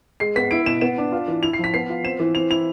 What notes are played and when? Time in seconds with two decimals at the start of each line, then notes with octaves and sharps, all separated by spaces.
0.20 G#3 C7
0.36 B3 B6
0.51 E4 D7
0.66 B2 E7
0.81 B3 E7
0.98 D4
1.12 F4
1.28 E3
1.43 E4 F7
1.53 C7
1.59 F3 B6
1.74 B3 C7
1.90 F4
2.04 C4 E7
2.20 E3
2.35 C4 F7
2.51 E4 F7